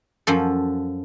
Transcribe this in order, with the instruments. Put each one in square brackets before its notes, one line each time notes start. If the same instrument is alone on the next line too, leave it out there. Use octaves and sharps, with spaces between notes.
[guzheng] F#2 F3 A4